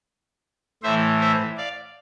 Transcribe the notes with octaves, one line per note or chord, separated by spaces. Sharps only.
A2 E3 C5 E5
C5 E5
D5 F5